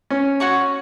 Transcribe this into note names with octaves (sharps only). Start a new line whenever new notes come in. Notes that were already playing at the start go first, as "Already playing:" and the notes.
C#4
F#4 C#5 F#5 C#6